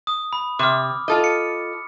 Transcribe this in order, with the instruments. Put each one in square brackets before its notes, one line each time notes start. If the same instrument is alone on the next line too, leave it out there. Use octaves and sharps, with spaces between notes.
[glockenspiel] D#6
B5
[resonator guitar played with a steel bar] C3 [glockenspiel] D6 F6
[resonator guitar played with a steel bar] F4 A4 D#5
[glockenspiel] C#7